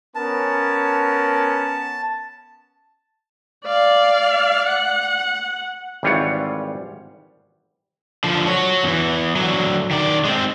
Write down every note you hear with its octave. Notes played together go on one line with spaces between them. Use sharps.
B3 C#4 A#4 A5
D5 F5
F#5
G#1 E3 G3 F4 C#5 F#5
D3 F3
F#4 C#5
E2 E3
D3 F#3
D#3 D5
G#3 C4